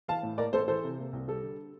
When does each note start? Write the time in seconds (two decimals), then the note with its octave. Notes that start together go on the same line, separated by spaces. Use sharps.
0.08 E3 F5 A5
0.23 A2
0.38 A#3 A#4 D5
0.53 A1 A4 C5
0.68 E3 A4 C5
0.84 C3
0.99 A#3
1.13 C2
1.28 G3 A4
1.43 D3